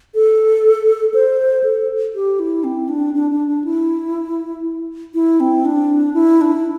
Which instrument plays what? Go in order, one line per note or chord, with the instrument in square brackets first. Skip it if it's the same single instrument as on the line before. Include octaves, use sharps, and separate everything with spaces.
[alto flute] A4
C5
A4
G4
E4
C4
D4
D4
D4
D4
E4
E4
C4
D4
E4
D4
E4